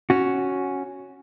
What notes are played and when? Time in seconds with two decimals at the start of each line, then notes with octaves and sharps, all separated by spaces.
0.10 C#4 F#4